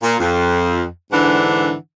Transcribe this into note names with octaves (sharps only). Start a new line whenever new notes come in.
A#2
F2
G#2 D3 E3 D4 F#5